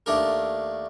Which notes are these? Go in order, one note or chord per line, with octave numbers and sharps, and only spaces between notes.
D#2 A3 D4 A#4